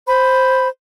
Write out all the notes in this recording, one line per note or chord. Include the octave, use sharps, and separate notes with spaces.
C5 B5